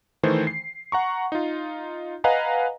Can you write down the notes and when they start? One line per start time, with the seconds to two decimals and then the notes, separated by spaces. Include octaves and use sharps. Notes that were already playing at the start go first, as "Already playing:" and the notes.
0.23 D#3 E3 A3 C5
0.47 C7
0.92 F#5 A#5 C#6
1.32 D#4 F4
2.24 B4 D#5 F5 F#5 G#5 A#5